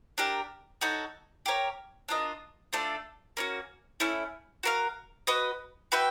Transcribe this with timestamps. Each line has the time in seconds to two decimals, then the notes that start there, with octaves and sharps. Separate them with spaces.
0.18 D4 G4 A#4
0.81 D#4 F#4 A4 C#5
1.46 G4 A#4 C#5
2.09 D4 F4 A#4 D#5
2.73 A3 D4 F4 A4
3.37 A#3 C#4 F#4
4.00 A3 C#4 E4
4.63 F#4 A#4 D5 F5
5.27 F#4 B4 D#5
5.92 F#4 B4 E5 G5